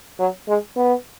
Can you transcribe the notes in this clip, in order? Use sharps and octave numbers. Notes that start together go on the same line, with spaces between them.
F#3
G#3
B3